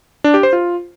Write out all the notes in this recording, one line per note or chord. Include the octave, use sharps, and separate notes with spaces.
D4
G4
C5
F4